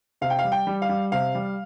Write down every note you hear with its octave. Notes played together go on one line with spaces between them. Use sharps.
C3 F5
G5
F5
G3
G5
G3
F5
G3
C3 F5
G3